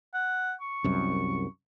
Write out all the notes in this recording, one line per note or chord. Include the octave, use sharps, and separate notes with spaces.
F#5
C#6
C2 F#2